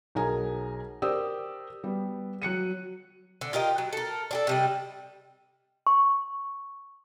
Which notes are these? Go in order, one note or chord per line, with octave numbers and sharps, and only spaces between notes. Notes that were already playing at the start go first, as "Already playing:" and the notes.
B1 G#4 A#4 C#5 G#5 A#5
G4 A#4 C5 D5 D#6 E6
G3 B3
F#3 F#6 C#7 D#7
D3
F4 G4 A#4 D#5
F#3
A4 A#4
D4 G4 A4
C3 G3 D#5
C#6